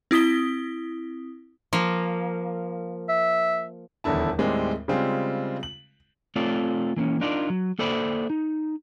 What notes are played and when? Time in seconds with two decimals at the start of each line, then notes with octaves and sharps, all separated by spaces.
0.11 C4 E4 D#6 B6 G7
1.73 F3 A#3
3.09 E5
4.04 D#1 E2 D3 E4 A5
4.39 D#2 A2 G3 G#3 C4
4.88 C#3 G3 G#3 C4 F4
5.63 F#7
6.36 A3 C4 F4 A4 C#5 D5
6.97 E3 A#3 C4 C#4
7.21 D4 D#4 F4 A#4 D5
7.50 F#3
7.79 A#3 A4 C5 D5 E5 B5
8.30 D#4